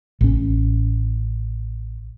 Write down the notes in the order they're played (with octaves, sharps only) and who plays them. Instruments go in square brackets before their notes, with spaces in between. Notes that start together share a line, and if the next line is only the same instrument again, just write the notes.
[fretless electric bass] A1 C#4